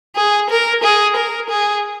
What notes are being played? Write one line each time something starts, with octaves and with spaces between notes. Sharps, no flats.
G#4
A#4
G#4
A#4
G#4